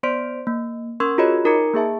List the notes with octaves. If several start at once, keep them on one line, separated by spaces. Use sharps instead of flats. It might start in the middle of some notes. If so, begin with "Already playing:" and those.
B3 C5 D5 C6 B6 D7
A#3
C#4 A#4 C6 C#6 E6 G#6
F4 F#4 G#4 C#5 D#5 B5
D#4 A#4 A#5 D6 G#6 C#7
A#3 G#4 E5 A5